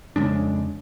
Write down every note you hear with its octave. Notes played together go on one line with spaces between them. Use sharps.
F2 C#3 G#3 D4